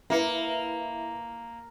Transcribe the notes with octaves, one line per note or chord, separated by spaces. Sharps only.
A#3 E4 B4 C#7